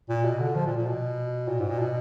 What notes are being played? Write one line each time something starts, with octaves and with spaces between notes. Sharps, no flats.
A#2
B2
D3
F3
A#2
A#2
B2
A#2
G#2
A#2
B2